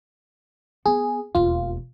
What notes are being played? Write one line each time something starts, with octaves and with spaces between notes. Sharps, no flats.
B3 G#4
E1 D#2 F4